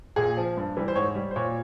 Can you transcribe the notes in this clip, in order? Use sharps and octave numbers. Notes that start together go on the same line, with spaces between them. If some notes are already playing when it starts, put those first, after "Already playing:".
A#2 G#4
F3
G2
E3 G3
C5
G#2 C#5
G3
C5
A#2 C#5